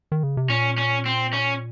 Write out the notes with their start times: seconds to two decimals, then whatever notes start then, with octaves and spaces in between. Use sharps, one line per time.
0.12 D#3
0.23 C#3
0.37 C3
0.49 A#2 C#4
0.78 C#4
1.06 C4
1.33 C#4